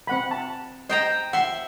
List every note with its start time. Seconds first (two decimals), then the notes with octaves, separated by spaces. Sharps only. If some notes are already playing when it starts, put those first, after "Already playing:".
0.07 C4 F#5 B5
0.31 A5
0.89 C5 D#5 G5 A#5
1.33 E5 F#5 C6